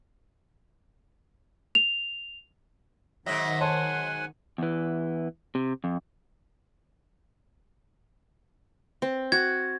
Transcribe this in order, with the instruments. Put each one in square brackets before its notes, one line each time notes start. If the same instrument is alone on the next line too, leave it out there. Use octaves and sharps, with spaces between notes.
[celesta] F7
[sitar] G#2 F#3 [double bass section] D#3 [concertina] D#5 E5
[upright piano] C#5 A5 C6 [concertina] F#5 G#5
[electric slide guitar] E2 E3
C3
F2
[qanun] C4
[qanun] F#4 [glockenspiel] G#6